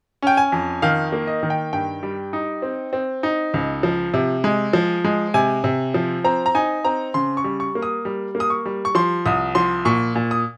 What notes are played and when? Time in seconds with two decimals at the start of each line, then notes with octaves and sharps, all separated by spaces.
0.22 C#4 G5
0.37 G#5
0.52 F2
0.82 D#3 F5
1.12 A#3
1.27 D#5
1.43 D#3
1.50 G5
1.73 G2 G5
2.03 G3
2.33 D#4
2.62 C4
2.93 C4
3.23 D#4
3.54 C#2
3.83 F3
4.14 C3
4.44 G#3
4.73 F3
5.04 G#3
5.34 C3 G#5
5.64 C3
5.94 F3
6.24 C4 A#5
6.46 A#5
6.55 D#4 G#5
6.84 C4 A#5
7.14 C#3 C6
7.37 C#6
7.44 G3
7.60 C#6
7.75 A#3
7.82 D#6
8.05 G3
8.35 A#3
8.40 D#6
8.50 C#6
8.66 G3
8.85 C#6
8.95 F3 C6
9.26 C2 D#6
9.55 F3 C6
9.85 A#2 C#6
10.16 A#2
10.31 D#6